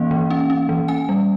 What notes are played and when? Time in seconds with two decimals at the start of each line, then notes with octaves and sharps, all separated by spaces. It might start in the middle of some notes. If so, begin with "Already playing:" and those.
Already playing: E3 A#3 C#4 F5
0.11 E3
0.30 C#4
0.50 C#4
0.69 E3
0.88 C#4 G#5
1.09 G3